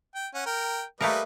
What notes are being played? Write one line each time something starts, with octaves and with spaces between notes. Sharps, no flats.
G5
C#4 F#5
A#4 G5
G3 A3 A#3 A#4 B4 D#5